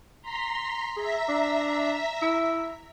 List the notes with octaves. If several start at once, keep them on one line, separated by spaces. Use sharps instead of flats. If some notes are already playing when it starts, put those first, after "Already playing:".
A#5 C6 B6
G#4 E5 A#5 B6
D4
E4